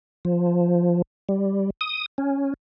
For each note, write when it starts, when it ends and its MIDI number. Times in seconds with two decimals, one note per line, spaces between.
0.25 1.02 53
1.29 1.70 55
1.81 2.06 87
2.18 2.54 61